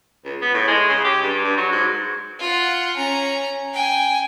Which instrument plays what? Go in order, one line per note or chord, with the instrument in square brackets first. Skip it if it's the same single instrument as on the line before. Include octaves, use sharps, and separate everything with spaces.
[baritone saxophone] C#2
B3
A2
G#3
C#3
G4
G2
G2
F#3
G#2
[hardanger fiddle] F4 F#5
C#4 A#5
G5 G#5